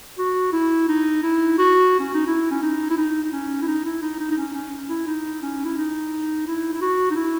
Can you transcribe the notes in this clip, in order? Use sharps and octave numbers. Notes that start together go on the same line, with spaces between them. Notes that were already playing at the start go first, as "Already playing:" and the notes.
F#4
E4
D#4
E4
F#4
C#4
D#4
E4
C#4
D#4
E4
D#4
D#4
C#4
E4
D#4
E4
D#4
D#4
D#4
C#4
C#4
E4
D#4
C#4
E4
D#4
E4
E4
F#4
D#4
E4